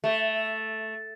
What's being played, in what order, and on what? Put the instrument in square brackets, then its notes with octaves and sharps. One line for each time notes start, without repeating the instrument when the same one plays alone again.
[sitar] A3